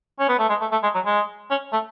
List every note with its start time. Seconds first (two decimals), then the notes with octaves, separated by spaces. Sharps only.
0.19 C#4
0.29 B3
0.39 A3
0.49 G#3
0.61 A3
0.72 A3
0.83 G#3
0.94 F#3
1.06 G#3
1.51 C#4
1.73 A3